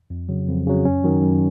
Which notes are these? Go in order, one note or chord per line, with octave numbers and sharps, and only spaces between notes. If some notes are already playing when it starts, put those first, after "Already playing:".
F2
C#3 F#3
F2
C#3 F#3
F#2 C#4
D#3 F#3
F#2